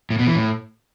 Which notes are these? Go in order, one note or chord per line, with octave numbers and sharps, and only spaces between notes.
A2
B2
E3
A2